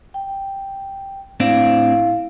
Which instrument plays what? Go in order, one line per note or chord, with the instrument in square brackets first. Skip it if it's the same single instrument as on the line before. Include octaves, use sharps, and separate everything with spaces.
[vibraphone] G5
[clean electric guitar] A2 C4 D4 [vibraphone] E4 F5